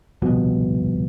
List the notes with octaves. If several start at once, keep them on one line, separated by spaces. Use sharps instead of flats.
D1 C2 F2 B2